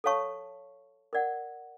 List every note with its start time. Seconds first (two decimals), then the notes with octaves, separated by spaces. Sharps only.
0.04 A4 C#5 F5 A5 C#6
1.13 A#4 D5 F#5